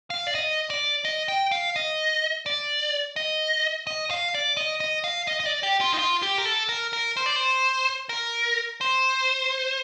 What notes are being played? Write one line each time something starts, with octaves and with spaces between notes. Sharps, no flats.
F5
D5
D#5
D5
D#5
G5
F5
D#5
D5
D#5
D#5
F5
D5
D#5
D#5
F5
D#5
D#5
D5
G4
F4
D#4
F4
G4
A#4
A4
A#4
A#4
C5
D5
C5
A#4
C5